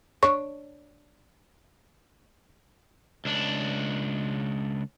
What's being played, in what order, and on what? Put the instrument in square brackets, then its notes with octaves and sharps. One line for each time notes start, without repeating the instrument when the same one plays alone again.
[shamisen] D4 C#5 [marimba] C#6
[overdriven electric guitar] C#2 D4